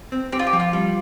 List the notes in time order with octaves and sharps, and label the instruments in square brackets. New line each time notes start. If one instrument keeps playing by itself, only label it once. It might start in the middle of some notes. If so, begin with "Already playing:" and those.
[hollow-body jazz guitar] C4
[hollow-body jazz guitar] C4 [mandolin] G4
[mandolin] F4
G4
[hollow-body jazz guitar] F3
[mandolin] F4
[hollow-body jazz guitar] G3